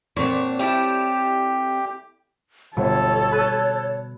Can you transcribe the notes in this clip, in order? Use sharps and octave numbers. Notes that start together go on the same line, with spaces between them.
A#2 C4 D4 F#4 C#5
G3 E4 G4 A4
G1 B2 A4 C#5
B5 F#6 D#7